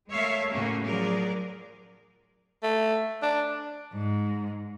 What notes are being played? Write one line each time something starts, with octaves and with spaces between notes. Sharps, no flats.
G#3 A3 A#4 C#5 E5 F5
A2 C#3 A3 A#3 C#4 F#4
F3 F#3 G#4 A#4 D5
A3
D4
G#2